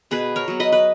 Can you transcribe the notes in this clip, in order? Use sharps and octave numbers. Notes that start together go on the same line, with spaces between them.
B2 G#4 B4
A#4 C#5
F#3 B3
B4 D#5
B4